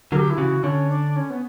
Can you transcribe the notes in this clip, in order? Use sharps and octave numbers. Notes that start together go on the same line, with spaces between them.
D3 F#3 G4 A#4
E4
C#3 E3 F#4
D3 C#4
D4
C#4
B3